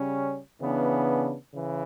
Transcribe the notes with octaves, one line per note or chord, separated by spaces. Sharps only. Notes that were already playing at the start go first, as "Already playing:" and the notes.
Already playing: C#3 G3 C#4
C#3 E3 B3 D4
C#3 E3